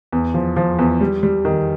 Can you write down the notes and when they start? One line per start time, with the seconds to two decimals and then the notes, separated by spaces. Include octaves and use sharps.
0.13 E2
0.34 F3
0.56 F3
0.79 E2
1.01 G3
1.23 G3
1.45 D#3